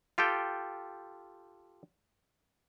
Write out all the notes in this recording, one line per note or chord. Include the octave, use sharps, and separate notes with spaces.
F4 G4 A4 G5